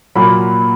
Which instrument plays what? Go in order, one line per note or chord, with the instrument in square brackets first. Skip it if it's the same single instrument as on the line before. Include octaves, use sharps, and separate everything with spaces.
[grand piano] A#2 F#3 A#3 B5